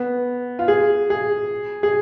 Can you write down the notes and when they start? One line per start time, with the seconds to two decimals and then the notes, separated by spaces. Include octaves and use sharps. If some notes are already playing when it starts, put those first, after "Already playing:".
Already playing: B3
0.59 F4
0.68 G#4
1.10 G#4
1.83 G#4